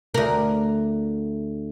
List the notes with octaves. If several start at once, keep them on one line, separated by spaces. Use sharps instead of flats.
D2 A#4